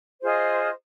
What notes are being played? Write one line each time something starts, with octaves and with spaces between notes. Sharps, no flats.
F4 G#4 C5 D#5